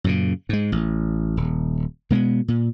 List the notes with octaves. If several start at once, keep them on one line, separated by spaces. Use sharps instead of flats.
F#2 A#2 C#3
G#2 G#3
A1
D#1
B2 G#3 A3 B3
A#2